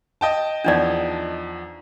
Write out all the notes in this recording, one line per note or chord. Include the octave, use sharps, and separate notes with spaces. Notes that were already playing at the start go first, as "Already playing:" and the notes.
D#5 G5 A5
E2 F3 D4 D#4 D5 F#5